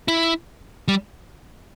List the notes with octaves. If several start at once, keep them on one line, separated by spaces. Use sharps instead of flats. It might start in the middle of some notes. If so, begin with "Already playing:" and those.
E4
G3